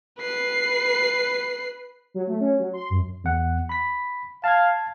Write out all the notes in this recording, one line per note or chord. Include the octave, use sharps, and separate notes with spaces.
B4 C7
F#3
A3
C#4
F#3
C6
F#2
E2 F#5
B5 B6
F5 A5 G#6